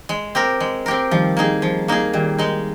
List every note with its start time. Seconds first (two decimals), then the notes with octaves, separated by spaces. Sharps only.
0.09 G#3
0.35 C4 G4 A#4
0.60 G#3
0.86 C4 G4 A#4
1.11 D#3 F3 G3
1.37 A#3 D#4 G#4
1.62 F3
1.88 A#3 D#4 G#4
2.13 A#2 D#3 G3
2.38 G#3 D#4